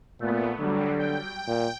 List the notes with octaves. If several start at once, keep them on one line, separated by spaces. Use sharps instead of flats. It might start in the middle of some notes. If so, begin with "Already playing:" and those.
A#2 A3 B3
D3 F#3 G3
G5
A#2